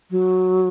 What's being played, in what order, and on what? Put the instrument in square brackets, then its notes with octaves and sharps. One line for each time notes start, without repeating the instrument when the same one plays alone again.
[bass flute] F#3